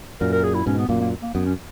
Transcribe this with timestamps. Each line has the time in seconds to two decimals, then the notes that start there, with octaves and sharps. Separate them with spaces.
0.21 F#2 A#2 A#4
0.32 A#4
0.43 G#4
0.54 E4
0.66 G#2 B2 C#4
0.78 B3
0.89 F#2 A#2 A#3
1.01 A#3
1.22 A#3
1.34 F#2 B3
1.46 C#4